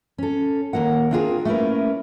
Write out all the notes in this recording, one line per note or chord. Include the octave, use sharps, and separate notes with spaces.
C#4 A4
D#2 C#3 A#3 A#4 F#5
C4 D4 F4 F#4 G#4 A#4
A3 A#3 C#4 E4 A#4 B4